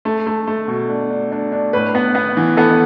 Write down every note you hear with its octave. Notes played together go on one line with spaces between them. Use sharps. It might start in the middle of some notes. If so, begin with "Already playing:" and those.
A3
A3
A3
B2
D4
D4
D4
D4
A2 B4
B3
B3
E3
B3 A4